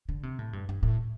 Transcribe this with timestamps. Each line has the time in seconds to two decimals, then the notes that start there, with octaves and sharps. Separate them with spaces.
0.09 D3
0.23 C3
0.39 A2
0.53 G2
0.69 G2
0.83 A2